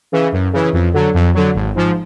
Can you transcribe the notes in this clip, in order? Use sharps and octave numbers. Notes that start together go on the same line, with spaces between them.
C#3 E3
F#2
C#3 E3
F2
D3 F#3
F2
D3 F#3
G#1
G#2 F3